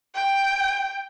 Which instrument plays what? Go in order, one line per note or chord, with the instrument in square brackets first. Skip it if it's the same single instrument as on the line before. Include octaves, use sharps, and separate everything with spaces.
[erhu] G5